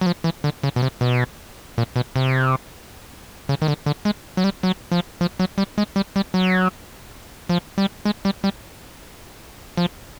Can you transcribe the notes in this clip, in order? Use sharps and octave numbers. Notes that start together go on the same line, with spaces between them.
F#3
F3
E3
D3
C#3
B2
C3
B2
A#2
B2
C3
C#3
D#3
D3
D3
G#3
F#3
G3
F#3
F3
F3
F#3
G3
G#3
G3
G3
F#3
F3
G3
G#3
G3
G3
F3